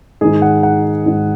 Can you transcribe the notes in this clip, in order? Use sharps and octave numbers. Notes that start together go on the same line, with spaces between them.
G#2 D#3 G#4
F#5
F#5
G#2 D#3